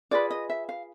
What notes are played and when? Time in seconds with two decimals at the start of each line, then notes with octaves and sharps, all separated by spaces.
0.11 F4 G#4 B4 D5
0.31 D#5
0.50 E5
0.69 F5